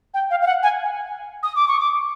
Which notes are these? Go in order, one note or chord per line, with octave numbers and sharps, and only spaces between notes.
G5
F5
F5
F#5
G#5
D#6
D6
C#6
D6